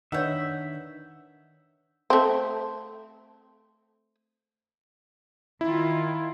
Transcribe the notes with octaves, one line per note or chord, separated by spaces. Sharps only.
D#3 D4 D#4 B4 C#5 E5 F#5 G6
A3 C4
D#3 E4 F4